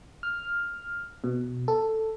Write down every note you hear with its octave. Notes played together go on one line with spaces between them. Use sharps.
F6
B2
A4